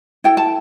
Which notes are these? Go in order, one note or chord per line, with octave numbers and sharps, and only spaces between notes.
E4 A4 G5
A5